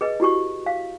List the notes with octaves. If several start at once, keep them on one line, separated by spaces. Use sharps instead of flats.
G#4 B4 D#5
E4 F#4 G4 C#6
F5